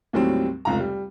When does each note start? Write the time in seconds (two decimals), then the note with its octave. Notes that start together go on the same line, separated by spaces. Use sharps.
0.13 D#2 A2 F#3 G3 C4
0.65 F1 C#2 A#5
0.80 G3